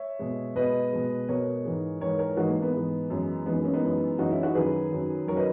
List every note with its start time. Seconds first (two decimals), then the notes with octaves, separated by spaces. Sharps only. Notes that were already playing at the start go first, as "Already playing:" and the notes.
Already playing: C#5 E5
0.19 B2 G#3
0.55 B2 G#3 B4 D#5
0.92 B2 G#3
1.28 B2 G#3 A#4 C#5
1.64 G#2 E3 G#3
2.01 G#2 E3 G#3 A#4 C#5
2.19 A#4 C#5
2.37 G#2 E3 G#3 D#4 F#4
2.49 A#3
2.62 B3
2.74 G#2 E3 G#3
3.10 F#2 E3 G#3
3.46 F#2 E3 G#3 B3 D#4
3.64 A#3 C#4
3.73 B3 D#4
3.83 F#2 E3 G#3
4.19 F#2 E3 G#3 D#4 F#4
4.31 C#4 E4
4.43 D#4 F#4
4.55 F#2 D#3 F#3 G#4 B4
4.91 F#2 D#3 F#3
5.27 F#2 D#3 F#3 A#4 C#5
5.36 B4 D#5